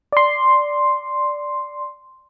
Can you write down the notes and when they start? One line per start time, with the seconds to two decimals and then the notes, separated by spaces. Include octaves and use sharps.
0.13 D5 C6